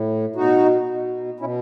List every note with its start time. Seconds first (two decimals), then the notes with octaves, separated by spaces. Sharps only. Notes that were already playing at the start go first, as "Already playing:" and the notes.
Already playing: A2
0.35 B2 D#4 F#4
0.88 B2
1.40 B2 C#4 E4